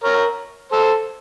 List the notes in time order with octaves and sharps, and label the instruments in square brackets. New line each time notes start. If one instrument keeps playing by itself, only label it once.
[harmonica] A#4 C#5
A4 C5